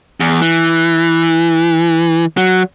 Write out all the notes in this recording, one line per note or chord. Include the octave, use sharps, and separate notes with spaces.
E2
E3
F#3